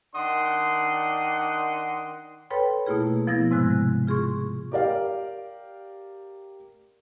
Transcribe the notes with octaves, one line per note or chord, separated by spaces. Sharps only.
D#3 D4 D5 D#5 F#5 C6
A4 B4 C#5 G5 B5 C6
B2 A3 A#3 E4 F4 G#4
B2 F3 B3 E4 G#6 A#6
G#2 C3 G#3 F#6
F4 G#4 C6 C#6
G4 A#4 D5 F5